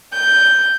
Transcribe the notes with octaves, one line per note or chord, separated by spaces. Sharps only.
G6